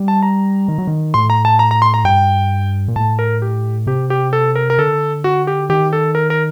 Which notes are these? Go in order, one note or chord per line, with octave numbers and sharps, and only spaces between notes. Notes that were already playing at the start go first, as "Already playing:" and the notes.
Already playing: G3
A5
A#5
D#3
F#3
D#3
A2 C6
A#5
A5
A#5
A#5
C6
A#5
G2 G5
A#2
A2 A5
A#4
G4
C3 G4
G4
A4
A#4
A#4
D3 A4
F#4
G4
D#3 G4
A4
A#4
A#4